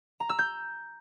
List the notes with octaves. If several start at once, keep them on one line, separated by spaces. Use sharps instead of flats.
A#5
E6
G6